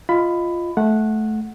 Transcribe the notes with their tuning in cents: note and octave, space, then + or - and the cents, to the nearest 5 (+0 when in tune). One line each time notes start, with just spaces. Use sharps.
F4 -5 D#5 +0 B5 +15
A3 -20 F#5 -10